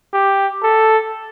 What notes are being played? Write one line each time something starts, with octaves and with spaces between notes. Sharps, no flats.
G4
A4